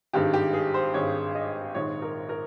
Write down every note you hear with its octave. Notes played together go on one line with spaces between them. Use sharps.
G#1 G2 D#3 G#3 G4
G4
G#4
C5
G#1 G2 D#3 G#3 C#5
D#5
A#1 G#2 D#3 C#5
A#4
A#4